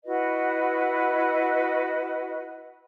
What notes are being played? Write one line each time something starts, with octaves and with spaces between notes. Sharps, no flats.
E4 F#4 B4 D#5